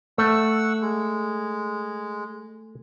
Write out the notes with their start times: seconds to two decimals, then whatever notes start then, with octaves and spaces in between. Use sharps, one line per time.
0.18 A3 F#5 C#6 E6
0.82 G#3